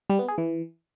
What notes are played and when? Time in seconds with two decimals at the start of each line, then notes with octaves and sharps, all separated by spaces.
0.10 G3
0.19 B3
0.28 G#4
0.38 E3